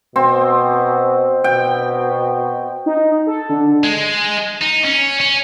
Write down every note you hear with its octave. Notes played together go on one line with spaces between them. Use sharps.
B2 C4
B2 G5
D#4
A4
D3
G#3
D#4
C#4
C#4